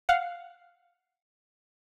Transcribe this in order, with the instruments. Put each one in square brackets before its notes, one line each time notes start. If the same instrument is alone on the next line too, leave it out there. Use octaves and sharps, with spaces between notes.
[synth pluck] F5 F#5